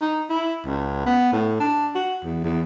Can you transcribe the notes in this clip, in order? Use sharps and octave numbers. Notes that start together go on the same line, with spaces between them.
D#4
E4
C#2
B3
A2
D4
F#4
E2
E2